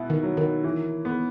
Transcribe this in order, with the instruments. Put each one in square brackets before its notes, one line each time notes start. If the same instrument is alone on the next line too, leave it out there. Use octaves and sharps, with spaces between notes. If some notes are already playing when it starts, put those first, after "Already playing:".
Already playing: [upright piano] B2 B3 E4
[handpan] D#3
[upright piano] F#3
[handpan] D#3
[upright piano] E3
B3